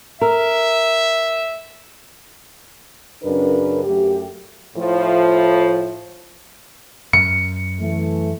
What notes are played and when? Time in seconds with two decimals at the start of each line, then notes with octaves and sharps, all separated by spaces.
0.21 A#4 E5
3.24 F#2 C#3 D4 A#4 B4
3.85 F#2 A3 G4
4.76 A2 F3
7.13 F#2 C#7
7.80 E3 A3